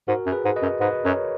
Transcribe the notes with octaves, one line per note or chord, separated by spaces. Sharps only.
G#2 F#4 A#4
F#2
G#4 B4
G#2
B4 D#5
F#2
G#2 B4 D#5
F#2 A#4 C#5